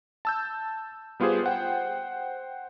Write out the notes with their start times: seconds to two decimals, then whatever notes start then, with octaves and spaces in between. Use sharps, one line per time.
0.25 A5 E6 G6
1.20 G3 B3 F4 G4 G#4 C5
1.44 C5 F#5 G5